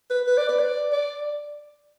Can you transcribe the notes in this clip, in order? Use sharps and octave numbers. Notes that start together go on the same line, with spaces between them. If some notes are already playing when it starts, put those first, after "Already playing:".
B4
B4
D5
B4
D5
D5